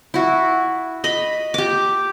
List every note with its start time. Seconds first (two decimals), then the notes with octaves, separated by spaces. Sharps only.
0.14 E4 F#4
1.04 D#5 B5
1.54 G4 D6